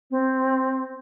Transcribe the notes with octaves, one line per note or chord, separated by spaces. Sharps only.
C4